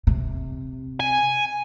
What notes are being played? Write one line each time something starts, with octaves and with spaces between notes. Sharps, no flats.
C3
G#5